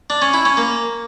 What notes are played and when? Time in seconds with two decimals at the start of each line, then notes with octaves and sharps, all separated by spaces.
0.10 D4
0.22 C#4
0.34 E4
0.45 C#4
0.57 A#3